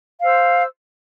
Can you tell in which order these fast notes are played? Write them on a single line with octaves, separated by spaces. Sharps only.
F5 C5 E6